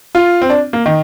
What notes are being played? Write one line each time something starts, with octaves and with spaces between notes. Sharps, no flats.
F4
C4
D4
A#3
D#3